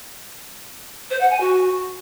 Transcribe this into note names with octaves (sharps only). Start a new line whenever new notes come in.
C5
F#5
G#5
F#4